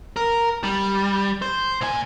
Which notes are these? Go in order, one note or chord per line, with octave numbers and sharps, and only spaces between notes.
A#4
G3
C5
A#2 G#5